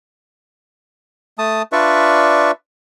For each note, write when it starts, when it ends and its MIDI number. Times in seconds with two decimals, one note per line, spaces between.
1.38 1.62 57
1.38 1.62 81
1.38 1.62 87
1.72 2.51 62
1.72 2.51 65
1.72 2.51 71
1.72 2.51 74
1.72 2.51 76
1.72 2.51 85